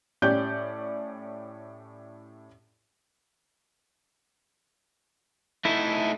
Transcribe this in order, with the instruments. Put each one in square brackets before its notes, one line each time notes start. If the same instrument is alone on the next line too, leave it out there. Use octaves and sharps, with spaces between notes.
[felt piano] A2 C#4 G4 D5 G6
[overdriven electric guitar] A3 D#4 [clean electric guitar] E4